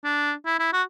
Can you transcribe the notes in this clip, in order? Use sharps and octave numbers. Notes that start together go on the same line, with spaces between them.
D4
E4
E4
F#4